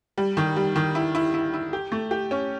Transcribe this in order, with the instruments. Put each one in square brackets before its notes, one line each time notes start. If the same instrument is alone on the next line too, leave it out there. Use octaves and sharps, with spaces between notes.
[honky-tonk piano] G3
D#3
G3
D#3
E4
E4
E4
E4
G4
A3
G4
C#4